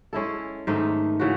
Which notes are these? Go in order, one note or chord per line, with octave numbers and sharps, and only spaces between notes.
G#3 C#4 E4 A4
G#2 D#3 A3 D#4
C#3 E3 F#4